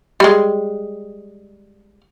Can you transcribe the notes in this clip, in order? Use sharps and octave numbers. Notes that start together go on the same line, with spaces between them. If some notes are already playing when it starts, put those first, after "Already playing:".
G3 G#3